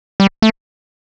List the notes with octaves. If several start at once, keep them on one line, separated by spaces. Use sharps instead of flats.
G3
A3